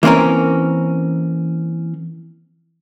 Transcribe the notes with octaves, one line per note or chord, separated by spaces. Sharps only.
E3 A#3 C4 C#4 A#4